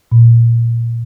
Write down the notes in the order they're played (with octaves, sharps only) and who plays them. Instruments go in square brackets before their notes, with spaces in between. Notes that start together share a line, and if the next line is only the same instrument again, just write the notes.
[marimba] A#2